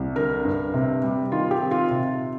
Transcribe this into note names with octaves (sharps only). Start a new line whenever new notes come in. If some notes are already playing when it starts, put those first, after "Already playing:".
Already playing: C2
D3 A#4
G2
C3
G3
D#3 F4
G4
C4
F4
C3